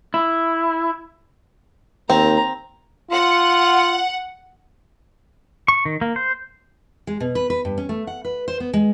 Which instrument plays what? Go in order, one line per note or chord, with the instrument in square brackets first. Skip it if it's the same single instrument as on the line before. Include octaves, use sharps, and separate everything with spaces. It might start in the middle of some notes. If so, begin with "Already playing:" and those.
[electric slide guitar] E4
[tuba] D#2 [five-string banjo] C4 [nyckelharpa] A#5
[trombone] F4 [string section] F#5
[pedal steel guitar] C#6
D#3
A#3
C5
[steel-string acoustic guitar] G#3
B2
B4
B4
G2
C#4
A3
F#5
B4
C5
B3
G#3